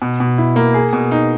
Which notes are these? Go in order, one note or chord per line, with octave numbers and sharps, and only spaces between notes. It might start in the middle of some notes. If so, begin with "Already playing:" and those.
B2
B2
E4
A#3
G#4
B2
D#4